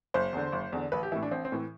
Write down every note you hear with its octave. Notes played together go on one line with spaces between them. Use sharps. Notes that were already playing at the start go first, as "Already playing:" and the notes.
F#1 C5
E2 D3
F#1
E2 D3
A1 B4
G4
A2 E3 E4
D4
A1 C4
C4
A2 E3